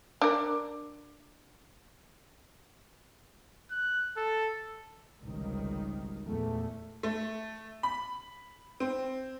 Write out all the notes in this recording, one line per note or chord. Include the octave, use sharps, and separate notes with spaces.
D4 A#4
F#6
A4
G#1 C#2 C3 D#3 G3
E2 A#2 A3
A3
B5
C4